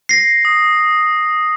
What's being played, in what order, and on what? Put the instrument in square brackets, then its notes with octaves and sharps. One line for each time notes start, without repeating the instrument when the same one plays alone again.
[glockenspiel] A#6 C7
[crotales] D#6